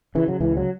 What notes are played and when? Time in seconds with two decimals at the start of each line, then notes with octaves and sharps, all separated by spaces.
0.15 C#3 E3
0.28 F#3
0.40 C#2 E3
0.57 F#3